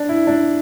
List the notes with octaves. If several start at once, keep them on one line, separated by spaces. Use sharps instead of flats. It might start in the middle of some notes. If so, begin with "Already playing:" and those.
Already playing: D4
E4
D4